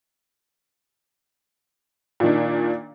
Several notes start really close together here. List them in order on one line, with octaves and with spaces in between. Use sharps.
A#2 D#3 D4